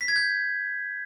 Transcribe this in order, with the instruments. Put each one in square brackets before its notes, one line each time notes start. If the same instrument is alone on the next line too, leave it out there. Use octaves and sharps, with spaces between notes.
[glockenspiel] B6
G#6
G6